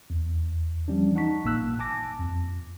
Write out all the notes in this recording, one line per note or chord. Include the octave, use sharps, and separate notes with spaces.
E2
E3 F3 G3 C#4 D4
D#4 F#5 A5 C#6 B6
G#1 A#2 A#3 E6 F#6
G#5 A5 D6 A#6
F2